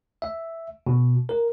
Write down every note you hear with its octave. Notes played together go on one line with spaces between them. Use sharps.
E5
B2
A#4